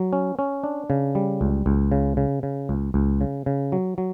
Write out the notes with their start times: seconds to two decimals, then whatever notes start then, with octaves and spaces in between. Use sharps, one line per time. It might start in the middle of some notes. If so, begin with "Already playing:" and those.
Already playing: F#3
0.13 C#4
0.39 C#4
0.64 D4
0.90 C#3
1.15 G3
1.41 C#2
1.66 C#2
1.92 C#3
2.17 C#3
2.43 C#3
2.69 C#2
2.94 C#2
3.21 C#3
3.46 C#3
3.72 F#3
3.98 F#3